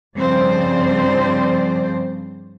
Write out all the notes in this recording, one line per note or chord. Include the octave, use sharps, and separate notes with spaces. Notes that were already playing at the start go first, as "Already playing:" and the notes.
G2 C#3 F3 C4 C5 D5